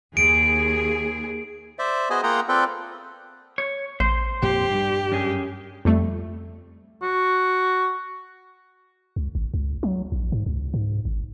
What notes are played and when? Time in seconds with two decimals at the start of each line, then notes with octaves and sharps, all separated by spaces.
0.17 D#2 G#4 D7
1.79 C5 D5 E5
2.10 B3 F#4 G#4 C5 D#5 G#5
2.23 A#3 F4 G#4 F#5 G5 A#5
2.48 C4 F4 A4 B4 D5 G5
3.58 C#5
4.00 A1 C5
4.42 F2 A#2 G4
4.71 G2 G3
5.12 F#2 G#4
5.85 F2 G3 A3
7.02 F#4
9.16 C#2
9.35 G#1
9.54 C#2
9.83 F#3
10.12 A#1
10.32 G#2
10.46 C#2
10.74 G#2
11.05 G#1